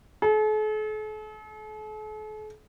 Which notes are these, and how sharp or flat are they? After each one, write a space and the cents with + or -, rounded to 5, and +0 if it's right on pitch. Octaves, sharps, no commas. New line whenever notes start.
A4 -45